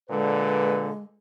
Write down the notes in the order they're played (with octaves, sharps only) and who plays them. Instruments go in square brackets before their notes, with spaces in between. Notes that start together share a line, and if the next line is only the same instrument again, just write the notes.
[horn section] A#2 D3 [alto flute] G#3 [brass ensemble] B4